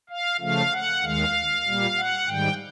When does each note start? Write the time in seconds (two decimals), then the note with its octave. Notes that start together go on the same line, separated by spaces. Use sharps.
0.09 F5
0.40 C#3 F3 A3 F5
0.72 F#5
1.02 D#2 D#3 G#3 F5
1.65 A#2 G3 A#3
1.96 F#5
2.27 G#2 D#3 G3 G5